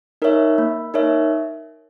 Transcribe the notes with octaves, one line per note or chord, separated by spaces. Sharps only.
D#4 A#4 C#5 E5
A#3
D#4 A#4 C#5 E5